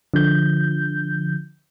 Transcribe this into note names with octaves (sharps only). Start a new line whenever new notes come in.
D3 F3 G6